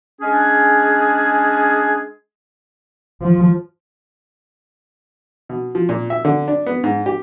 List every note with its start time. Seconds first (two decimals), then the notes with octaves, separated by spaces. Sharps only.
0.22 G#3 C#4 D4 G#4
3.22 F3
5.49 B2
5.75 F3
5.89 A#2
6.10 E5
6.25 D3
6.48 D4
6.66 B3
6.84 G#2
7.06 G4